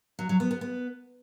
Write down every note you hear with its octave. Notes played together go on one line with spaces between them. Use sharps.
F#3
F#3
B3
B3
B3